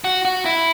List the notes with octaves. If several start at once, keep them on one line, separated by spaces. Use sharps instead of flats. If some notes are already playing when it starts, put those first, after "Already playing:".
F#4
F#4
E4